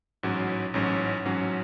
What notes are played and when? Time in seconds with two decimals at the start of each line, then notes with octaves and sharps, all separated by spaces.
0.23 A1 G#2 F#3 C#4 F#4
0.74 A1 G#2 F#3 C#4 F#4
1.25 A1 G#2 F#3 C#4 F#4